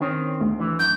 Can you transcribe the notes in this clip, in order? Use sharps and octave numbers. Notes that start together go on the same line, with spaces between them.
D#3 C4 C#4
D2
E3
F#2 G6